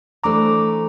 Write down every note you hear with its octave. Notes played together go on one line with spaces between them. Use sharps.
E3 A3 D4 A4 C5 A#5 D6